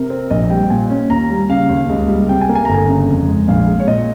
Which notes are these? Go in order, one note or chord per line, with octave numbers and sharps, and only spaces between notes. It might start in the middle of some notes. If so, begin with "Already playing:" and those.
Already playing: C3 A#4
C4
A#1 D#5
G3 G5
A#2 G#5
C#4
D#2 A#5
G3
C#3 F5
D#2
C#2
G3
C3 G5
G#5
A#3
G#5
G1 A#5
G#5
C#3
F2
G#3
A#1 F5
G#3
C#5
A#2 D#5